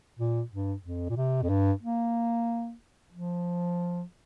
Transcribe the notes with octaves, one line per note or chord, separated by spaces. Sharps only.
A#2
G2
F2
A#2
C3
F2
G2
A#3
F3